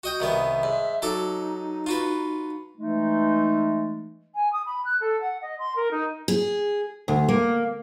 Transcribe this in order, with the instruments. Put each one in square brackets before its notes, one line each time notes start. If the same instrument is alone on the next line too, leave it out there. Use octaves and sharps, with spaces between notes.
[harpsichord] F#4 D#5 G5
[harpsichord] C2 D#3 B3 [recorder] E5
[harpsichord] G#2
[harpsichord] F#3 A4 D6 [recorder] D#4
[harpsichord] F4 F#4 B4
[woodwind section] E3 G#3 A3 D#4
[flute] G#5
D#6
B5
F#6
A4
F#5
D#5
C6
A#4
D#4
[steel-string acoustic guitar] G#4
D2
A#3